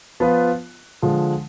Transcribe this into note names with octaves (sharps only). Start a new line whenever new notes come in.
F3 B3 F4 B4
D3 F3 G#3